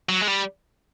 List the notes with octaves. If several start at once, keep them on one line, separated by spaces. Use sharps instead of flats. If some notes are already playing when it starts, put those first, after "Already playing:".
F#3
G#3
G3